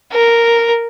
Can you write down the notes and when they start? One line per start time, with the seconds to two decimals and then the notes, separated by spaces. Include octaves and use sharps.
0.13 A#4